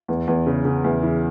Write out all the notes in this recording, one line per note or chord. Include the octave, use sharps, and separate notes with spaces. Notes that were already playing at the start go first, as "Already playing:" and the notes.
E2
E2
C#3
C#3
E2
E3